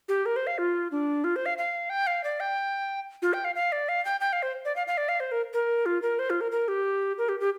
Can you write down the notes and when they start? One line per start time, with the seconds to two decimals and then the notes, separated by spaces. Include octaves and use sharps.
0.09 G4
0.26 A#4
0.36 C5
0.47 F5
0.58 F4
0.92 D4
1.24 F4
1.36 C5
1.46 F5
1.58 F5
1.90 G5
2.07 F5
2.24 D5
2.40 G5
3.22 F4
3.33 G5
3.45 F5
3.55 F5
3.72 D5
3.89 F5
4.05 G5
4.21 G5
4.33 F5
4.43 C5
4.65 D5
4.76 F5
4.87 F5
4.97 D5
5.09 F5
5.20 C5
5.32 A#4
5.53 A#4
5.86 F4
6.02 A#4
6.19 C5
6.30 F4
6.41 A#4
6.52 A#4
6.68 G4
7.18 A#4
7.29 G4
7.40 G4